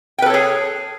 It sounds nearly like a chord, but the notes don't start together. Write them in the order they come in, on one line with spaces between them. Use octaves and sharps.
G5 B4 A4 C#5 G#4